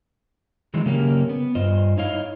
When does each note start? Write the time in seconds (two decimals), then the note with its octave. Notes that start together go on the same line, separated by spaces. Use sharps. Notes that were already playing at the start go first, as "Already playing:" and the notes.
0.74 D#3 E3 F#3 G#3
0.86 C#3 F#3 A#3 C#4 G4
1.29 B3
1.55 G2 F4 C5 D#5
1.98 D#4 E4 C#5 D#5 F5